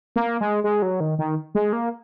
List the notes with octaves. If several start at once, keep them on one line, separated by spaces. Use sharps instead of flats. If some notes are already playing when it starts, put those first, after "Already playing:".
A#3
G#3
G#3
F#3
D#3
D#3
G#3
A#3